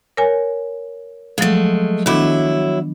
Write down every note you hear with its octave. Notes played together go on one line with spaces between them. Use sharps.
A#4 C#5 G#5
F3 F#3 G#3 A3
D#3 F#3 B3 D4 E4